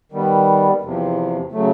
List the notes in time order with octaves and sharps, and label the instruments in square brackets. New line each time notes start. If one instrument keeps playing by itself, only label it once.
[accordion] D#3 G3 B3
E2 C3 F3
C#3 F#3 A3